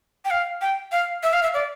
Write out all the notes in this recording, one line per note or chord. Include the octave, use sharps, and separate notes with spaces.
G5
F5
G5
F5
E5
F5
E5
D5